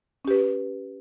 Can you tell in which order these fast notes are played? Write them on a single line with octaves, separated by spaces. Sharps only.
C#4 G4 B4